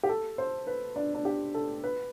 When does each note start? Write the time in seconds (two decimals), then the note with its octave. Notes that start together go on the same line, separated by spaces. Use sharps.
0.03 G4
0.09 A4
0.38 C5
0.67 B4
0.96 D4
1.15 D4
1.25 G4
1.54 A4
1.84 B4